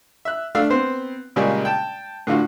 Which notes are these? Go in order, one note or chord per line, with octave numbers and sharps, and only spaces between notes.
E5 F#6
A3 D4 F5 E6
B3 C4 C5
A#2 C#3 G3 G#3 A#3 C#4
G5 A5
A2 D3 F4 F#4